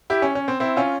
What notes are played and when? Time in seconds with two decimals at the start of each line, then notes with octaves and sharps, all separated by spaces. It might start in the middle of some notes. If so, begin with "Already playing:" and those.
0.10 E4 G4
0.22 C#4
0.35 C#4
0.48 C4
0.60 C4 E4
0.77 C#4 F4